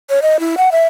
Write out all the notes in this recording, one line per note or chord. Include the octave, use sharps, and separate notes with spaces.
C#5
D#5
E4
F#5
E5